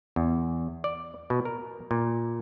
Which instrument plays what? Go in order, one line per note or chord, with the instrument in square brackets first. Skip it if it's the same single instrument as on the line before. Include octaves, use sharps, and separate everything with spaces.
[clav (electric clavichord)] E2
D5
B2
A#4
A#2